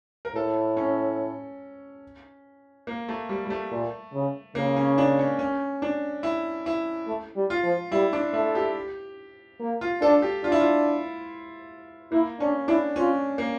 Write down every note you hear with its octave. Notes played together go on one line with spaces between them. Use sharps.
A#4
A2 A4
C#4
A#3
A3
G3
G3
A3
A#2
C#3
C#3 A#3
C#4
D4
C#4
C#4
D4
E4
E4
A3
G3
F4
F3
G3 E4
D4
A3 E4
G4
A#3
F4
D4 A4
G4
D4 F4
E4
F4
A#3 E4
C#4 D4
D4 E4
C#4 F4
A#3